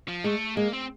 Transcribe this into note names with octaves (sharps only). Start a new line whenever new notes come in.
F3
G#3 A3
G#3 A#3
C4